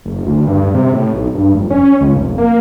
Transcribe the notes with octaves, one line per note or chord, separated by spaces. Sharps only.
F#1
D2
G2
C3
A2
B1
G2
F1
C#4
C#2
F1
A#3